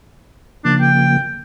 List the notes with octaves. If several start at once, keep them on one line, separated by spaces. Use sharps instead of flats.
C#3 F3 A#3 D4
G5